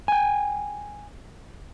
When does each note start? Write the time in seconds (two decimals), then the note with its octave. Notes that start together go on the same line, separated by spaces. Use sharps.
0.08 G5 G#5